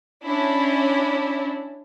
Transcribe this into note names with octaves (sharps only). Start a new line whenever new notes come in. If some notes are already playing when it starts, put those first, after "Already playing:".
C#4 D4 E4